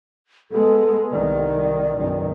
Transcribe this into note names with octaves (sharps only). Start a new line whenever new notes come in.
G#3 B3 A4
C2 D#3 D5
F#1 B1 D#3